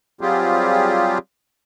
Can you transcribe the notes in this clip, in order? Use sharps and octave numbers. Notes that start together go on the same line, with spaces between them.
F#3 G3 C4 F4 G4 G#4